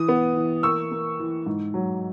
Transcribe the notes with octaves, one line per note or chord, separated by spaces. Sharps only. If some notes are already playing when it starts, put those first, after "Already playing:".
Already playing: E3 D#6
B3
E3
A#3 C#6 E6
A#3
E3
G#2
F#3